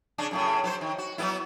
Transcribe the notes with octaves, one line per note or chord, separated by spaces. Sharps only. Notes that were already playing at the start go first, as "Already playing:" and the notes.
C#3 D4
F#2 A2 C#3
F#3 B4 C5
D#3
F#4
F#3 B3 E4